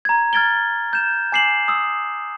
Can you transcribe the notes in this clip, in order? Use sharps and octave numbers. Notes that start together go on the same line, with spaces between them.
A#5 G#6
F6 G#6 A6 D7 G7
G6 E7
G#5 D6 C7 E7 F#7
D#6 E6